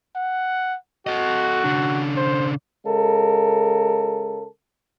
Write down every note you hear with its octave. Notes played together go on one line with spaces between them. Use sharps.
F#5
F#4 A4 D#5
C#3 D4
C5
C#3 G#3 A4 A#4